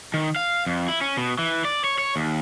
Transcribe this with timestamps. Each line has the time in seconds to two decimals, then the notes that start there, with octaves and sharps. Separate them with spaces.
0.14 D#3
0.36 F5
0.66 F2
0.88 E4
1.01 C#4
1.17 B2
1.39 E3
1.65 D5
1.84 C#5
1.98 C#5
2.16 D#2